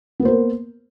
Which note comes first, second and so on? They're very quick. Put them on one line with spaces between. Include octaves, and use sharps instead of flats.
B3 A#3 C5 A#4